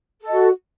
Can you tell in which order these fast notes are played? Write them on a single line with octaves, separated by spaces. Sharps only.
A4 D#5 F#4